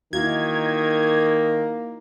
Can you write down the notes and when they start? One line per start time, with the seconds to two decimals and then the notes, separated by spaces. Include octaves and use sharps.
0.13 D#3 A#3 D#4 E4 F#4 G#6